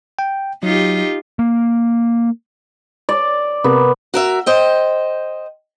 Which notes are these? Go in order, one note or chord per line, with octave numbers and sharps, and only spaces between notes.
G5
F#3 D#4 F4 G4
A#3
D5
C3 B3 A#4
F#4 A#4 E5
C5 D#5 G5